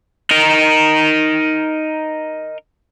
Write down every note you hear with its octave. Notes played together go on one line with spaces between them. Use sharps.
D#4 A#4